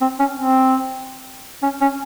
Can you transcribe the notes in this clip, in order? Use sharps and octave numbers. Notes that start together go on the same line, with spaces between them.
C4
C#4
C4
C#4
C#4